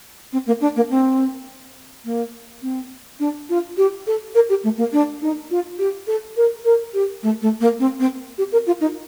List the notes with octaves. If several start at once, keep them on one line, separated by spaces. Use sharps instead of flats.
C4
A#3
D4
A#3
C4
A#3
C4
D4
F4
G4
A4
A#4
G4
A3
A#3
D4
D#4
F4
G4
A4
A#4
A#4
G4
A3
A3
A#3
C4
C4
G4
A#4
F4
D#4